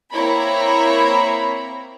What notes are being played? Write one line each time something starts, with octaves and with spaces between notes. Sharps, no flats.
A#3 C4 E4 C#5 A#5 B5